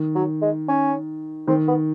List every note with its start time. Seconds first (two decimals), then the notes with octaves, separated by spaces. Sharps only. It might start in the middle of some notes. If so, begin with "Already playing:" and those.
Already playing: D#3
0.15 F#3
0.41 G#3
0.68 C#4
1.48 D#3 C4
1.68 B3